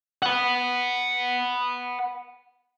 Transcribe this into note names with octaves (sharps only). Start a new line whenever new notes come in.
F#5 B5